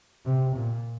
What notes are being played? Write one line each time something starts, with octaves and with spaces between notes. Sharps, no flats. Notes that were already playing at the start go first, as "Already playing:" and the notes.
C3
A#2